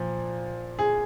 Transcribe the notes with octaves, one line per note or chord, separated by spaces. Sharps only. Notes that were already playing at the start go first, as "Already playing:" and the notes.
Already playing: A#2 F3
G#4